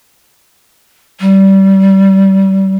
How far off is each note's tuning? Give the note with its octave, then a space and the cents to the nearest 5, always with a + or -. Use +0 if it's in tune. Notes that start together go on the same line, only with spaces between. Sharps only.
G3 -25